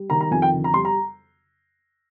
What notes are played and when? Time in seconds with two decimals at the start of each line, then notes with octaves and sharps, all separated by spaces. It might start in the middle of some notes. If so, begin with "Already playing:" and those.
Already playing: G3
0.10 D#3 A#5
0.21 A#5
0.31 F2 G#5
0.42 G5
0.53 D3
0.64 A#5
0.74 G3 C6
0.85 A#5